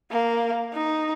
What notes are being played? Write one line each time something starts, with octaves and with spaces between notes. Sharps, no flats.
A#3
D#4